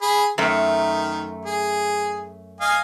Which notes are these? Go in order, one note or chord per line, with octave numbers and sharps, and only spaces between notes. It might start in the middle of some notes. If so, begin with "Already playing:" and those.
G#4 B5
F#2 D#3 A3
G#4
D#5 F5 G#5